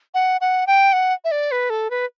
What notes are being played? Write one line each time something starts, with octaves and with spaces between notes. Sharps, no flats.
F#5
F#5
G5
F#5
E5
D5
B4
A4
B4